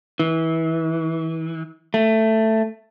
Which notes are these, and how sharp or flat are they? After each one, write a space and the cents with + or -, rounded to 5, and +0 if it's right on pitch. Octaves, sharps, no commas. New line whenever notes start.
E3 -25
A3 +10